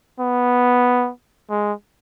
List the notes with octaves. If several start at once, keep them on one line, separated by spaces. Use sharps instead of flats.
B3
G#3